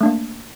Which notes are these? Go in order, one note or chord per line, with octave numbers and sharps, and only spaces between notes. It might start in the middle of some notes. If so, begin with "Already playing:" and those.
A3 A#3 D4